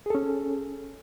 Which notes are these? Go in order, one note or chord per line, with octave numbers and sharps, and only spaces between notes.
C#4 G#4 A4